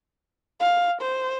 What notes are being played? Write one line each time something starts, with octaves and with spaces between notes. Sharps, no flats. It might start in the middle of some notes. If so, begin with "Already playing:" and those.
F5
C5